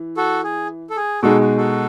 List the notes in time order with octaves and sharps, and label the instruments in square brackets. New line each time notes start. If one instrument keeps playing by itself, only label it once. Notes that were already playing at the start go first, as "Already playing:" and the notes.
Already playing: [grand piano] E3
[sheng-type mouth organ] F#4 A4
G#4
A4
G#4
[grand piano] B2 G#3 D#4 G#4 [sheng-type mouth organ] F#4 A4
[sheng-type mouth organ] F#4
F#4 A4